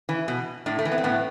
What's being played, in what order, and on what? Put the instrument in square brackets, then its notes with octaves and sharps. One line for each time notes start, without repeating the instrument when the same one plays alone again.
[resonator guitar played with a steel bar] E3
B2
A2 D4
A3
E3
B3
C4
A2 B3